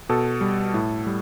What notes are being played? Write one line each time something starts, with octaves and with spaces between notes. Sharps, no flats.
B2 A4
G3
A2
G3